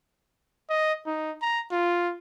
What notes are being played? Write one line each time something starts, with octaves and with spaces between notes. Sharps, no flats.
D#5
D#4
A#5
F4